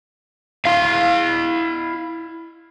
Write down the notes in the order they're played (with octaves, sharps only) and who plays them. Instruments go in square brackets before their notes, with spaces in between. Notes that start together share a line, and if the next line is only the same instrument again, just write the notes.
[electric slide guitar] E4 F5